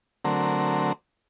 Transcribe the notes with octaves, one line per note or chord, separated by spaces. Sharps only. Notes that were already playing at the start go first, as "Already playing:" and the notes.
D3 F#3 A3 C4 A#4